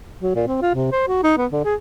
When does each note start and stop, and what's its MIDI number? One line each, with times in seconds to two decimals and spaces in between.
0.22 0.36 54
0.36 0.43 46
0.48 0.60 60
0.62 0.70 65
0.75 0.90 48
0.92 1.07 72
1.08 1.19 66
1.23 1.33 63
1.37 1.46 59
1.52 1.63 50
1.65 1.75 68